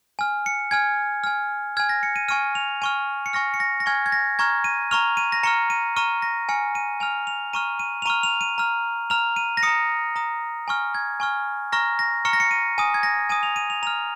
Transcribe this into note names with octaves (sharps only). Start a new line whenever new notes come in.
G#5 F6
C#7
G#5 F6 G#6
G#5 F6
G#5 F6 G#6
A#6
C#7
D#7
G#5 C#6 F6 D#7
F7
G#5 C#6 F6 D#7
C#7
G#5 C#6 F6 A#6
C#7
A#6
A#6
G#5 C#6 F6 G#6
G#6
A#6
A#5 C#6 F6 G#6
D#7
A#5 C#6 F6 F7
D#7
A#6
A#5 C#6 F6 C#7
D#7
A#5 C#6 F6 D#7
A#6
G#5 F6 C#7
D#7
G#5 F6 F7
F7
A#5 C#6 F6 D#7
D#7
F7
A#5 C#6 F6 D#7
F7
D#7
A#5 F6
A#5 F6 F7
D#7
A#6
A#5 D#6 C#7
A#5 D#6
G#5 C#6 F6
G#6
G#5 C#6 F6
A#5 C#6 F6 A#6
A#6
A#5 C#6 F6 C#7
A#6
C#7
D#7
G#5 D#6 D#7
G#6
A#6
G#5 D#6 D#7
F7
D#7
F7
A#5 F6 F7